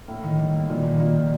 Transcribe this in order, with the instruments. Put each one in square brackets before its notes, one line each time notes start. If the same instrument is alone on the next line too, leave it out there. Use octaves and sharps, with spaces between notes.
[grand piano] A2 [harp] A#3
[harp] D#3
G3
A#3
[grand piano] A#2 [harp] D#3
[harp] D#3
[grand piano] A#2 [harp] A#3
[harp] G3